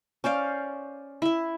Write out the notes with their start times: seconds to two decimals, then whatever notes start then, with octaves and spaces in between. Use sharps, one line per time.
0.24 C#4 C5 D5 F5
1.22 E4 E5